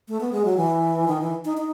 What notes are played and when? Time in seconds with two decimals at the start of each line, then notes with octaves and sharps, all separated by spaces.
0.08 A3
0.21 B3
0.32 G#3
0.45 F#3
0.57 E3
1.08 D#3
1.21 E3
1.45 D#4
1.57 D#4